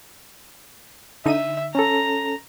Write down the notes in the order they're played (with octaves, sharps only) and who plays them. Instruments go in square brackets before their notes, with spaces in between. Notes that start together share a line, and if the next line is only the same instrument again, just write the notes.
[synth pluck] D3 D#4 D#7 [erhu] E5
[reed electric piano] C#4 A4 [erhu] A#5